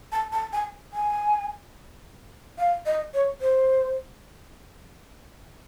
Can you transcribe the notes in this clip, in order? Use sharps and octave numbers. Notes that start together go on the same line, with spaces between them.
A5
A5
G#5
G#5
F5
D#5
C#5
C5